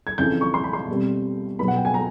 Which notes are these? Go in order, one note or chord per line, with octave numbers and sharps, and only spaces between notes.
G#6
F2 C#3 E3 G6
C#6
C6
B5
C6
B2 G3 C4
B2 F#3 B3 B5
F#5
G5
G#5
A#5